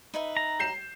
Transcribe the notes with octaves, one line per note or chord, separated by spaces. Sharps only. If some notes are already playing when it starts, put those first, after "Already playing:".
D#4 B4 E5
A#5
G6 C7 E7